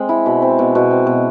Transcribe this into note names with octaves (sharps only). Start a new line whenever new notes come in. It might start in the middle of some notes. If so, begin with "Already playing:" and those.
Already playing: G#3 C4
E4
B2
C4
B2
B2
C4
B2